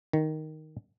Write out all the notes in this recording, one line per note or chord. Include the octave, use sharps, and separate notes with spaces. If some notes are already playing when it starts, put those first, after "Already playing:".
D#3